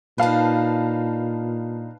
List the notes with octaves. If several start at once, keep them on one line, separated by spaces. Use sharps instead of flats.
A#2 D4 D#4 B4 F5 A5